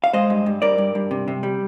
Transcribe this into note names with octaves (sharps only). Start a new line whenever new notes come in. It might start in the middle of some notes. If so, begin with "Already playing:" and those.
F5
G#3 C5 D#5
G2
G2
G2 A#4 D5
G2
G2
C3
C3
G3